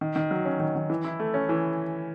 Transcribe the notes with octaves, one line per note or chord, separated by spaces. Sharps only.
D#3
D#3
F#3
C#4
D#3
D#3
E3
E4
A3
C#4
E3